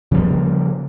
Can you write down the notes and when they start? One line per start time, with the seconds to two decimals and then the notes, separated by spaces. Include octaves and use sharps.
0.11 C#3 F3 G3 A#3